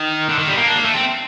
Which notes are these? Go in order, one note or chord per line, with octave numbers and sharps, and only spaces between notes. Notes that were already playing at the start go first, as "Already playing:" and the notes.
Already playing: D#3
D3
D#3
G3
A#3
D4
A#3
A3
C4